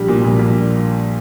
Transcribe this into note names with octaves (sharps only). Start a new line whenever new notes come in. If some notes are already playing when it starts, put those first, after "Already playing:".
Already playing: A#1 G3
A#2
A#1
A#1